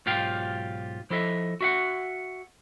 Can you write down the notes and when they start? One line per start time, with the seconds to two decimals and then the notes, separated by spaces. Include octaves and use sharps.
0.06 B1 G#2 F4 G4 F5 G5
1.10 F3 E4 A4 D#5 E5
1.61 F#4 E5 F#5